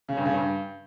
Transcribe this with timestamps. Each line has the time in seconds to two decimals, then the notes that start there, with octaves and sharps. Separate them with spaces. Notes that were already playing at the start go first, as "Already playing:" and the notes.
0.09 C#3
0.17 G2
0.25 C#3
0.34 G2